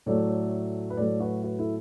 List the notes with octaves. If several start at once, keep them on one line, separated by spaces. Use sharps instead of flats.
A2 F#3 A3 A4 D5
B4
A2 F#3 A3 A4 D5
F#4 B4
F#4 B4
E4 A4